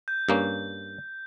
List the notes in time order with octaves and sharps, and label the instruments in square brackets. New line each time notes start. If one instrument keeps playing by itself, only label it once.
[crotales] G6
[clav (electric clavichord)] G2 A#3 C#4